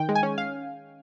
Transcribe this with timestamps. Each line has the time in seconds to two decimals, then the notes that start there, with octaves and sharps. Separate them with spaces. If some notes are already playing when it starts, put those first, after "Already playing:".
Already playing: D#3 G5
0.09 G#3
0.15 G#5
0.23 C#4
0.38 F5